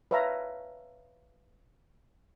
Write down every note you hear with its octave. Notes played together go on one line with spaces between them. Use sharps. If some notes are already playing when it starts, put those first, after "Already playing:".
B4 C#5 E5 F5 A5 A#5